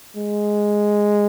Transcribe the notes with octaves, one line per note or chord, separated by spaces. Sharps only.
G#3